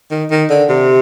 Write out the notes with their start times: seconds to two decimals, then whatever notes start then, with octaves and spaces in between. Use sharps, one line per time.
0.11 D#3
0.30 D#3
0.50 D3
0.69 C3